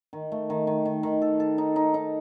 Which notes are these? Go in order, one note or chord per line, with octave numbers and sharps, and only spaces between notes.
D#3
A3
D#3
D#3
D#3
D#3
A4
A4
D#4
D#4
D#4